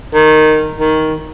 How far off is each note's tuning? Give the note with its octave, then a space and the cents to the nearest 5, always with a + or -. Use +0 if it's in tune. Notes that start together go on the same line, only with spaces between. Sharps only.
D#3 -10
D#3 +10